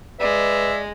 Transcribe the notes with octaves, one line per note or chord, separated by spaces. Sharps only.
G#3 B4 D5 E5